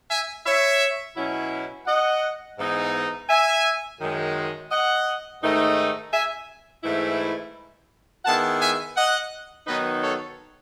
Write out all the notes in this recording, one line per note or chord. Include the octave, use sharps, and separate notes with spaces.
E5 G#5
C#5 E5
B2 F#3 C#4 E4
D#5 F#5
G#2 E3 B3 D#4
E5 G#5
F#2 D#3 G#3
D#5 F#5
G#2 D#3 A3 D#4
E5 G#5
G#2 E3 A3 E4
D#3 G#3 B3 E4 F#5 A5
E5 G#5
D#5 F#5
D#3 F#3 B3 D#4 B4 D#5
A4 C#5